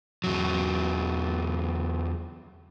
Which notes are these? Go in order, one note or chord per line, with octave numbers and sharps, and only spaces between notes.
E2 F#3